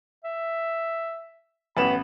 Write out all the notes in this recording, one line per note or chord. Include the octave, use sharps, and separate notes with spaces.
E5
A1 B3 B5 E7